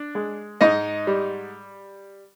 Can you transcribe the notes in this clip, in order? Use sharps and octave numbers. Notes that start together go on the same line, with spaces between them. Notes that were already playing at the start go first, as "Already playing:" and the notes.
Already playing: D4
G#3
G#2 D#4 D#5
G3